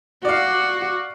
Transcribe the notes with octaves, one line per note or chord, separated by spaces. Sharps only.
F#4 D5 F5